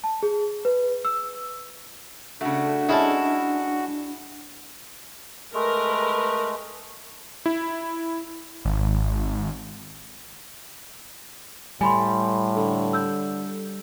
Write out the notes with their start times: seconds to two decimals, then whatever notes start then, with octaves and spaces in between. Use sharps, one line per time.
0.04 A5
0.23 G#4
0.65 B4
1.05 E6
2.41 C#3 A3 D4 F#4
2.89 G#3 C#4 E4 A5
5.54 G#3 A3 A#4 B4
7.46 E4
8.65 G#1
11.81 A2 G3 G#5 B5 C6
12.56 D3
12.93 E6 G6